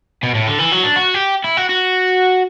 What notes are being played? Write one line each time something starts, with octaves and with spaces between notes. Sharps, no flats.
B2
A2
D3
E3
F#3
D4
F#4
G4
E4
F#4
F#4